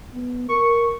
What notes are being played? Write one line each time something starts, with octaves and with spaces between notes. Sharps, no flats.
B3
A#4 C#6